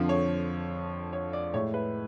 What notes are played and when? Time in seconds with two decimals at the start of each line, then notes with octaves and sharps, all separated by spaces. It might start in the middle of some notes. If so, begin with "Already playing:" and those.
Already playing: F2 D3 F3
0.09 C#5
1.13 C#5
1.33 D5
1.54 A2 G#3 C#5
1.74 B4